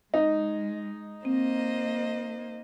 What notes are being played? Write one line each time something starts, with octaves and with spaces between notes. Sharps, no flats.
G#3 D#4 D#5
A#3 C4 C5 D#5